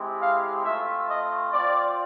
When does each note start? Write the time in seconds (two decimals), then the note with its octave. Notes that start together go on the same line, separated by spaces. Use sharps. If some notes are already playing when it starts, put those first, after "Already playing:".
Already playing: G#3 C4 E4 G4
0.22 F5
0.65 A3 C4 F4 E5
1.09 D#5
1.53 C4 F4 D5